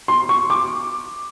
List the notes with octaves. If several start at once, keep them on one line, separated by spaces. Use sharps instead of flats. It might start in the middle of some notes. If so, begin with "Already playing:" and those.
C6
C#6
D6